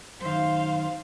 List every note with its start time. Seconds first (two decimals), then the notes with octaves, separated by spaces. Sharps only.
0.21 F#2 D#3 C5 F5